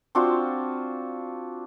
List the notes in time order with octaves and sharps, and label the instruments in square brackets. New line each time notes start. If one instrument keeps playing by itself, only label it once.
[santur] C4 D4 F4 F#4